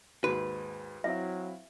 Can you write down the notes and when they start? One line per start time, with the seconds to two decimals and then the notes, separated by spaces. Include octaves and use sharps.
0.24 D#2 G#2 F#4 B4
1.04 F#3 C4 E4 E5 F5